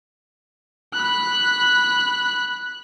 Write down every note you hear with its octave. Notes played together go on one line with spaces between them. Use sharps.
B5 F#6